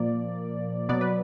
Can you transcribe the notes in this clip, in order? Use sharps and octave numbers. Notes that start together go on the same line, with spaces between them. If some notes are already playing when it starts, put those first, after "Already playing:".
Already playing: A#2 F3 A#3 D5
B2 F#3 B3 D5
B4